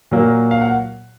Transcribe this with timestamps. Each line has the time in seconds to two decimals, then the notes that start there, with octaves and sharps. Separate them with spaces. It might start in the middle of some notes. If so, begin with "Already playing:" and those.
0.11 A#2 F#3 A#3
0.51 F5
0.61 F#5